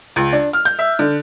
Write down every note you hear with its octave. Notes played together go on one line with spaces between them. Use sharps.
C#2
D4
F6
G6
E5
D3